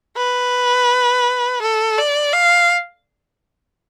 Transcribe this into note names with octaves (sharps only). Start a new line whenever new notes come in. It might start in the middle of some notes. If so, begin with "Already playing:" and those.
B4
A4
D5
F5